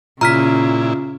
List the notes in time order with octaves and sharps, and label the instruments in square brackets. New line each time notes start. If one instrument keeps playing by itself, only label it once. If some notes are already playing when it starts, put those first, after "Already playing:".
[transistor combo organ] A#2 E4 [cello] C#3 [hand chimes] F4 [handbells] A#5 F6 B6